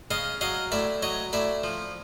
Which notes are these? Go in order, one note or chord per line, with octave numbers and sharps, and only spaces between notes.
C#3 D#5 F5
F#3 D#5 F5
A2 D5 E5
F#3 C#5 D#5
A2 D5 E5
F3